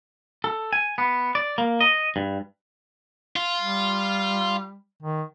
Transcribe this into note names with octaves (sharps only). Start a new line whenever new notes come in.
A4
G#5
B3
D5
A#3
D#5
G2
F4
G3
D#3